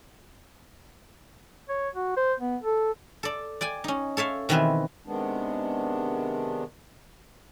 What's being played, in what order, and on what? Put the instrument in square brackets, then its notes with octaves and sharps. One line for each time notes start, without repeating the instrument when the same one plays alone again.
[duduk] C#5
F#4
C5
B3
A4
[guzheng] A4 D5
D5 G5 G#5
C#4 D#4
A4 C#5 E5 F5
B2 D#3 E3 C4 B4 E5
[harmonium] C3 D#3 G#3 B3 D4